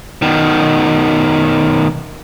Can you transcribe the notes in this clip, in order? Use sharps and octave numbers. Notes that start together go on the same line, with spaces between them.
B2 D#3